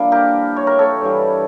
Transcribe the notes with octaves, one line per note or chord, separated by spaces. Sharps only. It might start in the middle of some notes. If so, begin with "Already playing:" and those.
Already playing: G2 F3 A#3 D4 E4
G4 A#4
C#5
A#4
A4 C#5
G2 E3 G3